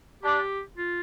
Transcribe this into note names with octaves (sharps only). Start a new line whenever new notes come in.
D4 G4
F4